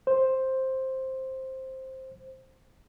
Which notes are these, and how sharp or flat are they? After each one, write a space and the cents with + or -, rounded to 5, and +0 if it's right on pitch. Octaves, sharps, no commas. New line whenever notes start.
C5 +10